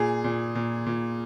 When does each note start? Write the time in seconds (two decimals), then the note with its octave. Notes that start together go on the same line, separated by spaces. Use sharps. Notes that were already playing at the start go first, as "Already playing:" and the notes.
Already playing: A#2 G#4
0.24 A#2
0.55 A#2
0.86 A#2